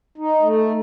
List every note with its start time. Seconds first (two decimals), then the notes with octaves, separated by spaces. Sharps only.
0.18 D#4
0.42 A3